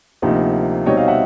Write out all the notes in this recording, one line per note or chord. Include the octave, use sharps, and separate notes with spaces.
D2 C3 F3 A#3 D#4
B2 G3 C4 D#4 C#5 D#5
D#5 F5
E5 F#5